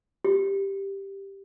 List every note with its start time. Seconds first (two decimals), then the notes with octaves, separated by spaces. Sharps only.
0.25 G4